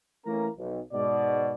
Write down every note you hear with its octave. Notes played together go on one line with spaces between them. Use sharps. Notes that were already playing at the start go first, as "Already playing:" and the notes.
E3 A3 A#3 C#4 A#4 A#5
B1
G#2 B2 D5